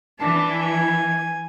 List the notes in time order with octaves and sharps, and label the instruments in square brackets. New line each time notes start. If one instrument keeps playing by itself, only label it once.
[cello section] E3 [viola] D4 A5
[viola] G#5